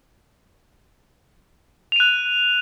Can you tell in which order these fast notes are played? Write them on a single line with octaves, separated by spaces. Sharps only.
F7 D#7 F#6